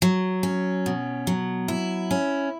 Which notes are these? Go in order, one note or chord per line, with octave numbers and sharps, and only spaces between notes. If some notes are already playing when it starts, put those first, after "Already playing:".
F#3
C#4
B2
F#3
E4
C#4